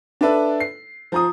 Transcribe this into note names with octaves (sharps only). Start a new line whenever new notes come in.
D4 A4 B4 E5
C7
F3 A#5 D#6